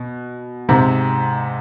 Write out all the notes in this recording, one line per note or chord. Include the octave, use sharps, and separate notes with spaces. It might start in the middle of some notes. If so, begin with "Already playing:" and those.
Already playing: B2
G#2 C3